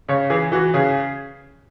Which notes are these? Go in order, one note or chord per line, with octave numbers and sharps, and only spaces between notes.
C#3 C#5
E3 G#4
E3 F#4
C#3 G#4